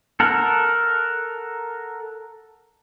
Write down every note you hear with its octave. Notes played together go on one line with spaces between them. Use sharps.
A4 A#4 F#5